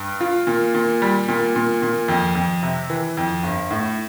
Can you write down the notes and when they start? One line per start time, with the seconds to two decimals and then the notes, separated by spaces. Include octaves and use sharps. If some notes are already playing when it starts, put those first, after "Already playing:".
Already playing: G2
0.21 F4
0.47 A#2
0.74 A#2
1.02 G3
1.29 A#2
1.56 A#2
1.82 A#2
2.08 F2
2.35 F2
2.63 C3
2.90 E3
3.17 F2
3.43 G1
3.70 A2